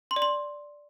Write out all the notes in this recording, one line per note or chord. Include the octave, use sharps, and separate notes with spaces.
C6
D5
C6